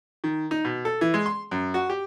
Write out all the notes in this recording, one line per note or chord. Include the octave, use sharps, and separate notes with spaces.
D#3
D#4
B2
A4
E3
G#3
C6
F#2
F#4
G4